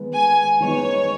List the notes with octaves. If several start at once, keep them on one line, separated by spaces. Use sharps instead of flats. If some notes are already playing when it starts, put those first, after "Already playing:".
Already playing: D#3 G#3 B3
G#5
D#3 G#3 B3 D#4 C#5